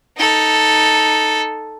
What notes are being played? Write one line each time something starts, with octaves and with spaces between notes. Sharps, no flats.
D#4 A4